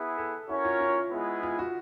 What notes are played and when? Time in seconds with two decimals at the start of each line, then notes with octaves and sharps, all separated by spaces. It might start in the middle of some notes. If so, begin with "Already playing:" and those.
Already playing: B3 E4 G#4
0.18 A4
0.49 C#4 E4 F#4 A#4 C#5
0.65 F4
0.81 F4
1.12 G#3 B3 E4 G#4 B4
1.43 F4
1.59 F#4